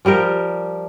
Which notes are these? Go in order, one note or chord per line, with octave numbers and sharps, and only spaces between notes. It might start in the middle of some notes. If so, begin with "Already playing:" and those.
F3 G3 G4 A#4